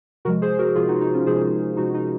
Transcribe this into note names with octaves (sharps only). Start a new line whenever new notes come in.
C3 F3 G#3 F#4 A#4
G#4 C5
F#4 A#4
C3 F3 G#3 F4 G#4
D#4 F#4
D#4
C#4 F4
C3 F3 G#3 G#4 C5
C3 F3 G#3 D#4 F#4
D#4